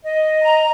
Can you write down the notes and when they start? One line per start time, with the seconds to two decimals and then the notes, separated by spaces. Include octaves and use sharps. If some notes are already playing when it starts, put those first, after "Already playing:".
0.02 D#5
0.43 A#5